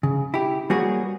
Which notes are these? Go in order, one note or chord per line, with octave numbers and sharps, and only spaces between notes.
C#3
E4 G4
G3 A#3 F#4 G#4 B4 C#5